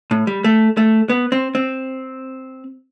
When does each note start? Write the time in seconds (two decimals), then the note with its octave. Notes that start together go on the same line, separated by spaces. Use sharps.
0.11 A2
0.27 G3
0.44 A3
0.77 A3
1.09 B3
1.32 C4
1.55 C4